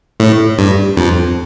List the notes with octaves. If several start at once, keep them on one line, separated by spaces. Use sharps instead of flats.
A2
G2
F2